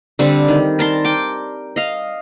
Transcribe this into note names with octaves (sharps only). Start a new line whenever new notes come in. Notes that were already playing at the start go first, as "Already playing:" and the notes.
D3 G3 C4
D#3
A#4 A5 C6
G5 D6
D#5 F5